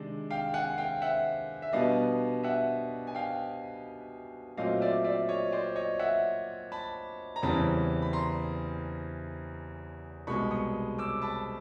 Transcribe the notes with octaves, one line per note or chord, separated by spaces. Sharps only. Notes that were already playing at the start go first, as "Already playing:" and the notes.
Already playing: C3 D#3 G#3 D4
F5 G5
F#5 G#5
F5 G5
E5 F#5
E5
B2 G3 B3 D4 D#5 F5
E5 F#5
G#5
F5 G5
A#2 F#3 A3 C4 D#5 F5
D5 E5
D5 E5
C#5 D#5
C5 D5
C#5 D#5
E5 F#5
A5 B5
A#5
E2 C#3 E3 G3 C4 A5 B5
B5
A#5 C6
C2 B2 G#3 B5 C#6
C#6 D#6
D6 E6
A5 B5